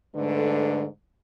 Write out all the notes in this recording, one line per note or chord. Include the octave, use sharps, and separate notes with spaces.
G#2 D3 A3 D4 A4 B4